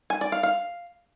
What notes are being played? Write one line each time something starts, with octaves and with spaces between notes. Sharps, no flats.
G#5
D5
F5
F5